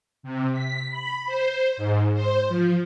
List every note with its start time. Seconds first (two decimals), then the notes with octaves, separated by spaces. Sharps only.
0.23 C3
0.53 B6
0.91 B5
1.27 C5
1.77 G#2
2.14 C5
2.48 F3